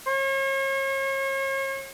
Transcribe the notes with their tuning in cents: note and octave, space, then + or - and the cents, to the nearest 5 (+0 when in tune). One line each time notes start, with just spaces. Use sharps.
C#5 -40